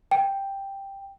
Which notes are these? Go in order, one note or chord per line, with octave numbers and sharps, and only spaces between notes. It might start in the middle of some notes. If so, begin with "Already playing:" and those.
G5